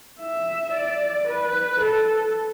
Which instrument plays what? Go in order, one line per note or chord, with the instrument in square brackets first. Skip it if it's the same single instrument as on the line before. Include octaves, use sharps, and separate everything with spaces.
[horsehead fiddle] E5
D5
B4
A4